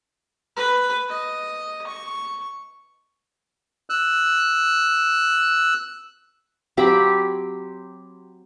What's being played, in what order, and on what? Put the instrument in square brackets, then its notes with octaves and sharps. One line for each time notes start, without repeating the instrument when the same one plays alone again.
[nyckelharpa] B4
D#5
C#6
[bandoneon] E6 F#6
[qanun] F#3 C4 G4 B5